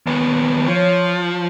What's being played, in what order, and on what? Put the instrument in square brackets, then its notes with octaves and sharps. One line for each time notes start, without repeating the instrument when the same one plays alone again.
[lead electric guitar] D#2 B3
[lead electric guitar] F3 [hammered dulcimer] C#5